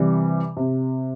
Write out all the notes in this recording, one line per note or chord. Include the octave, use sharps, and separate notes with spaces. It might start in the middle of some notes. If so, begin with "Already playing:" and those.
Already playing: C3 E3 G3
C3